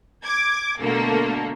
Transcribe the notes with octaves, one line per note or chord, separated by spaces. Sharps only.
D6 G#6
B2 D3 A3 A#3 A4